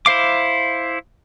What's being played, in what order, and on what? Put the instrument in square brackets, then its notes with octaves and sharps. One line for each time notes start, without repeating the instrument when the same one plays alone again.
[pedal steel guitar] E4 C5 F5 D6